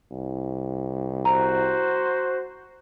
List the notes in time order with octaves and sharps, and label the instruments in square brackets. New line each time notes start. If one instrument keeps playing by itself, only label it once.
[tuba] C2
[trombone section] F#4 C5 [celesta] A#5